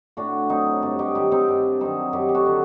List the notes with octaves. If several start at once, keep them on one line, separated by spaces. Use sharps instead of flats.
A2 D4 F#4
F#3 C4 D#4
G2 D4 F#4
D#4 G4
D#3 F#3 D#4 G4
C4 D#4
G2 D4
D#3 F#3 C4 D#4
F#2 D#4 G4
G4
F#4 A4
D3 F#3